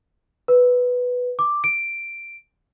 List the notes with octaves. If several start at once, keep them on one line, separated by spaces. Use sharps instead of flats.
B4
D6
D7